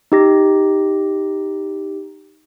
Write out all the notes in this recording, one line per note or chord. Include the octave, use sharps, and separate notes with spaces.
D#4 G4 A#6